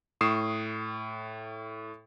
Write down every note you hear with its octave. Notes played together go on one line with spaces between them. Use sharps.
A2 C#6 D#6 C7 E7